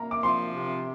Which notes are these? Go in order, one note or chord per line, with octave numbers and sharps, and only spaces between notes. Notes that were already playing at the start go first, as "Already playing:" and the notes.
Already playing: A#3 A#5
D6
F3 C6
C3